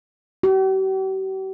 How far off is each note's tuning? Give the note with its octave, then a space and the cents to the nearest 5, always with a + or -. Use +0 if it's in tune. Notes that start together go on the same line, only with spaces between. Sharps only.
G4 -45